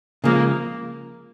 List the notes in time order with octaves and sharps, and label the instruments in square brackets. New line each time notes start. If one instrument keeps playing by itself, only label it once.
[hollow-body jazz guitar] C#3 F3 G#3 [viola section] A#3